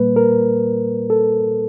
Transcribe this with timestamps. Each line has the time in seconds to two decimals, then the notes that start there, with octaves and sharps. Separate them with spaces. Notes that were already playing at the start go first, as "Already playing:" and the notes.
Already playing: A#2 G3 A#3 B4
0.16 A#4
1.10 A4